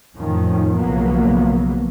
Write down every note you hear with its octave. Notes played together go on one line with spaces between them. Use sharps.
F2 A2 D#3 F3 C#4
B1 C#3 F3 F#3 A#3 B3